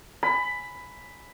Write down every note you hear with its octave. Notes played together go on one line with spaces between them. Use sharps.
B5